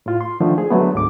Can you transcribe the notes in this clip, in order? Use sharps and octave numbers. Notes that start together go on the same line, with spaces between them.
A2 F4
C6
D3 D#3 F3 A3
G#4
D3 F#3 G#3 A3 B3
D2 G#2 D6